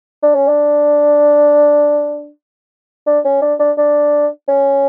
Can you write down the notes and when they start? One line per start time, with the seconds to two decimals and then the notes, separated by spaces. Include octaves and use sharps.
0.23 D4
0.35 C#4
0.48 D4
3.07 D4
3.25 C#4
3.42 D4
3.59 D4
3.77 D4
4.48 C#4